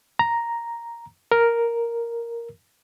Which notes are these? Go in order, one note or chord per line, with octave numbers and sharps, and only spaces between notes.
A#5
A#4